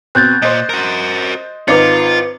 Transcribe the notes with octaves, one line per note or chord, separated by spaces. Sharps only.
B2 C4 F#6 G6 A6
A#2 C5 D#5
F#4 A#4
G#1 D#4 F4 B4 D6 C#7